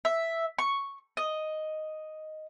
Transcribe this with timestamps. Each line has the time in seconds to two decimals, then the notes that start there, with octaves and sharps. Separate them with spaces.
0.05 E5
0.59 C#6
1.17 D#5